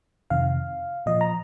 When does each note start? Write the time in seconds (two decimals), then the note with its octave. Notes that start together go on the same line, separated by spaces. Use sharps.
0.30 F2 C3 D#3 F5
1.06 A#2 F3 D#5
1.21 A#5